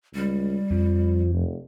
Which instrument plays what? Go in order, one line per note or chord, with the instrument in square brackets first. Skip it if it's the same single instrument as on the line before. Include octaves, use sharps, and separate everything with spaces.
[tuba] C#2 [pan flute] G3
[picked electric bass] F2 [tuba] F3
[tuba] F1